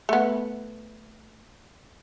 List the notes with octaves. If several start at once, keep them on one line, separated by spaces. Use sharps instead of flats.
A3 B3